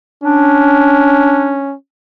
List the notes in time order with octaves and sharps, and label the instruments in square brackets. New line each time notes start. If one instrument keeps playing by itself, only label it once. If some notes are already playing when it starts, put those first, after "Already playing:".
[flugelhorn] C#4 [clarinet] D4